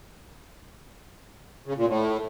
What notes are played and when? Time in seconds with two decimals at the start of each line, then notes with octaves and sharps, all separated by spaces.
1.66 C#3
1.77 A#2
1.88 A2